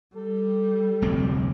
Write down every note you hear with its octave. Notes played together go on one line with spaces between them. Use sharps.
G3 A4
F1 D2 C4